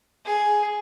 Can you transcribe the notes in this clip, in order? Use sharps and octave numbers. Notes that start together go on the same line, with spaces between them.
G#4